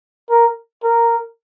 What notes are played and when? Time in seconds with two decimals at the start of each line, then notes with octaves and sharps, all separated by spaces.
0.30 A#4
0.84 A#4